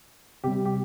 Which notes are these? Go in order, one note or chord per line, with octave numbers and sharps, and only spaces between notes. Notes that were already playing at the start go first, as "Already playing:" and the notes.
C3 G3 G4
G4